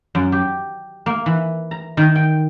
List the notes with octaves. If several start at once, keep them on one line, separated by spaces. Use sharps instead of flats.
F#2
G4
A#3
E3
A#5
D#3
G5